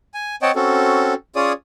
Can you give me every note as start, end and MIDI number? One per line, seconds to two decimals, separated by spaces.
0.14 0.36 80
0.42 0.51 60
0.42 0.51 73
0.42 0.51 75
0.42 0.51 78
0.42 0.51 79
0.42 0.51 81
0.55 1.14 60
0.55 1.14 61
0.55 1.14 66
0.55 1.14 69
1.36 1.53 61
1.36 1.53 65
1.36 1.53 68
1.36 1.53 73
1.36 1.53 74
1.36 1.53 87